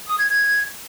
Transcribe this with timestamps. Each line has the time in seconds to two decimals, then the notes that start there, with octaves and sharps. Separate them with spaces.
0.07 D#6
0.17 G#6
0.28 G#6